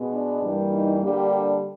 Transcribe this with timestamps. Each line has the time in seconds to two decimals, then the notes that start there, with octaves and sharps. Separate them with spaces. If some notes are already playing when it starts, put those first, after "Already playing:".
Already playing: B2 G#3 B3
0.11 D4
0.42 G2 E3 G3 A#3
0.71 D#4
1.01 D3 G3 A#3 D4 G4